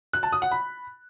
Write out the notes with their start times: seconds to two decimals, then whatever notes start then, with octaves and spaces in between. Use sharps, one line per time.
0.13 F#6
0.23 A5
0.32 D#6
0.42 F#5
0.51 B5